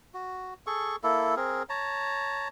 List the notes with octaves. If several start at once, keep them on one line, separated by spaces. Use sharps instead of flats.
F#4
G#4 A4 C#6
A#3 E4 A4
C4 G#4 A#4
C#5 A5 A#5